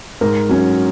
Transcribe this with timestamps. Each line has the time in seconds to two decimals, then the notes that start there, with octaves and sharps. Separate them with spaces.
0.21 G#2 A#4
0.49 F#3 C#4